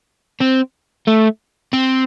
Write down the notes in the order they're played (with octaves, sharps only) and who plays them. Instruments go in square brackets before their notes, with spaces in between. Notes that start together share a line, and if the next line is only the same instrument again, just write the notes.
[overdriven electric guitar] C4
A3
C4